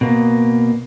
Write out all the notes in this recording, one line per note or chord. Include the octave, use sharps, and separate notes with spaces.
B2 A#3